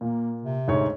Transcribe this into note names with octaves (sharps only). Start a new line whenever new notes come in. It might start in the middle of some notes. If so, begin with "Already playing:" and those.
A#2 A#3
C3
D2 G#2 C#5